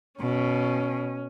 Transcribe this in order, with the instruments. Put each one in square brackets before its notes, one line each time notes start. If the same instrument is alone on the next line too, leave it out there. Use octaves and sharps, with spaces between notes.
[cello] B2 [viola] C#4